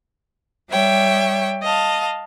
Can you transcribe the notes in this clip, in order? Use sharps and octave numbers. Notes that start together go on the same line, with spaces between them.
G3 C#5 E5 G5
D#5 F5 A5